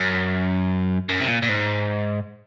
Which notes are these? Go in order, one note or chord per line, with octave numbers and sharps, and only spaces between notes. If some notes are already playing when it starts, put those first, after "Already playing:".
Already playing: F#2
F#2
C3
A#2
A#2
G#2